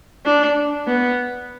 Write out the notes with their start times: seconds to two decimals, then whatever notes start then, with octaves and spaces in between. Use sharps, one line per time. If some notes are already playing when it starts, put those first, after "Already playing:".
0.26 D4
0.87 B3